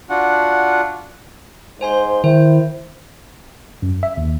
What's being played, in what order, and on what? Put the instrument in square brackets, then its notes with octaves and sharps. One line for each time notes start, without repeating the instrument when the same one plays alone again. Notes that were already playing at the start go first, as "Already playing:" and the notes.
[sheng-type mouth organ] D4 F4 F#4 F#5
[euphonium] G#2 [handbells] C5 G#5 C6
[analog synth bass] D#3 [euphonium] E4 [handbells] C5
[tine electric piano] F#2
E5
D#2